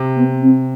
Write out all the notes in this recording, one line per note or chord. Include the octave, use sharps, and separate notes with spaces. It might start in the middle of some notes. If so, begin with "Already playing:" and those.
Already playing: C3
B3
C4